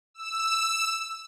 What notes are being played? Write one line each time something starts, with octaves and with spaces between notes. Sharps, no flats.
E6